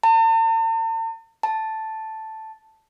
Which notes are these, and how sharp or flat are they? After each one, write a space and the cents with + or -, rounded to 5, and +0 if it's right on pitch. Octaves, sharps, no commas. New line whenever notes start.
A5 +45
A5 +0